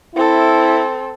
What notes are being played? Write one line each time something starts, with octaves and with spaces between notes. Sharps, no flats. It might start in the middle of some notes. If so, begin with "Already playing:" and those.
C4 E4 A4